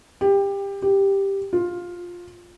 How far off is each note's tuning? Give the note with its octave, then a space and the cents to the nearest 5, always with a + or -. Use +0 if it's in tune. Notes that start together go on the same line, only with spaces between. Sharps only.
G4 +20
G4 +5
F4 +10